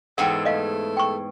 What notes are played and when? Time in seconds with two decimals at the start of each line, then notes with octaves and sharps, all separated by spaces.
0.18 E2 G#2 A4 F#5 G5
0.45 A3 D#5 F5
0.97 G5 C#6